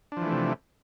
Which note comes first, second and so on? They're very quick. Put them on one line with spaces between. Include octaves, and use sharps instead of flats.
D4 F3 E3 A3 C3